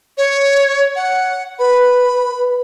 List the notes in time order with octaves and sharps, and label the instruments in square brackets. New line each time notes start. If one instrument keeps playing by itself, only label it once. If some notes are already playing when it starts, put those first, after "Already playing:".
[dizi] C#5
F#5
[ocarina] B4 [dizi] B5